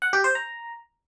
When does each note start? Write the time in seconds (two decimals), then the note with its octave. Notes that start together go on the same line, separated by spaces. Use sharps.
0.02 F#5
0.13 G4
0.24 C5
0.35 A#5